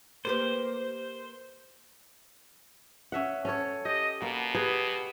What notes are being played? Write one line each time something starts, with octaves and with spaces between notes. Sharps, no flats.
A#3 G4 B4 C5
C#4 E5 F#5
C#4 A4 C#5
G4 D#5
B2 A#3
G4 G#4 B4